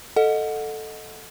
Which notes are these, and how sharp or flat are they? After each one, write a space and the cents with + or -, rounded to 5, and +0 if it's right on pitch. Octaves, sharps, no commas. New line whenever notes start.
A4 +0 D#5 +0 F#5 -20